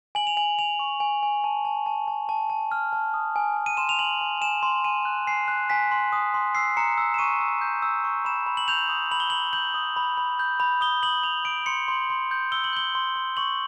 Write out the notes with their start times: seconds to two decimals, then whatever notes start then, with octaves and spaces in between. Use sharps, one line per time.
0.15 G#5 F#7
0.27 F7
0.37 G#5 F#7
0.59 G#5 F7
0.79 C#6
1.00 G#5
1.23 G#5
1.44 A5
1.65 A5
1.86 A5
2.08 A5
2.29 A5
2.50 A5
2.72 F6
2.93 A5
3.14 D#6
3.36 G#5
3.57 G#5
3.66 D#7
3.77 C6 E7
3.89 F7
3.99 G#5 F#7
4.21 G#5
4.41 G#5 E7
4.63 C6
4.84 G#5 D#7
5.05 F#6
5.27 G#5 C7
5.48 F#6
5.70 G#5 B6
5.91 C6
6.12 D#6
6.34 C6
6.55 E6 C7
6.77 A#5 C#7
6.98 E6
7.14 E7
7.18 C#6 D#7
7.40 E6
7.61 G6
7.82 E6
8.04 C#6
8.25 B5 E7
8.46 B5
8.57 F#7
8.68 G6 F7
8.89 D#6
9.12 B5 F#7
9.20 G7
9.30 B5 F#7
9.53 G6 F#7
9.74 D#6
9.96 B5
10.17 B5
10.39 G6
10.60 B5
10.81 D#6 G7
11.03 D#6 F#7
11.23 B5 F7
11.45 D#6 D7
11.66 C6 C#7
11.88 C6
12.10 C6
12.31 G6
12.52 E6 G7
12.64 F#7
12.73 G6 G7
12.95 C6
13.16 C6
13.37 C#6 F#7